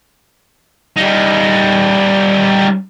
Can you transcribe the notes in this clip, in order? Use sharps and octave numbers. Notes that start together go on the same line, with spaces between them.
G3 D#4